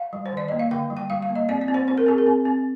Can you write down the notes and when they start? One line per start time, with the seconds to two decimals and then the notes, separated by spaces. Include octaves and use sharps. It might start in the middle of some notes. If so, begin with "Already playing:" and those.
Already playing: F5
0.13 G3
0.26 C5
0.33 D#3 D5
0.48 A#3 D#5
0.59 F5
0.71 D3 G5
0.90 G3
0.97 G5
1.10 G3 F5
1.23 F5
1.29 A#3
1.35 D#5
1.49 C4 D5
1.61 D5
1.68 C4
1.74 C5
1.87 C4 C5
1.98 A#4
2.06 C4 G#4
2.18 A#4
2.26 C4
2.45 C4